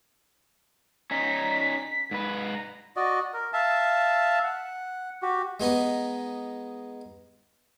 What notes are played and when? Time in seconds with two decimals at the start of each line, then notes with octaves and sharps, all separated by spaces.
1.11 C#4 D#4 B6
2.11 G#2 B4
2.52 A#5
2.96 F#4 D5 D#5
3.33 A#4
3.53 E5 F5 A5
4.44 F#5
5.22 F#4 G4
5.60 G#3 B3 D#4